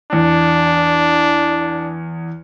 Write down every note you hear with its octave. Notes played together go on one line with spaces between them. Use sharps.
E2 D4